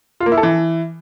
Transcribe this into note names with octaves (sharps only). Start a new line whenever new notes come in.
F4
A#3
E4
A4
E3